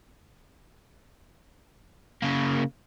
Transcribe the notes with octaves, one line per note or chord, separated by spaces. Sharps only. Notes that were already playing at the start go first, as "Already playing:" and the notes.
C#3 A#3